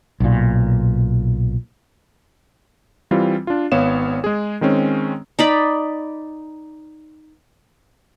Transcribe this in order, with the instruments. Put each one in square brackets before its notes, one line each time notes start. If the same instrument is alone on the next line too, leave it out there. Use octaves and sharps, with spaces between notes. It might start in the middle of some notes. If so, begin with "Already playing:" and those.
[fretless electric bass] B1 A#2
[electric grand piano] E3 G3 C4 F4
D4 F4
G#1 B3 C#5 F5 E7
G#3 G#4
D#3 G#3 C4 C#4
[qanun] D#4 D5 B5